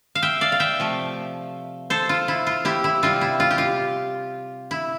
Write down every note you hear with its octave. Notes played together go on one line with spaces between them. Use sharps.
F5
E5 G5
D5 F5
F5
E5 G5
C3 F3 A3
A4 C5
F4
E4
F4
E4 G4
E4
C3 G3 C4 F4
E4
F4
G4
F4
E4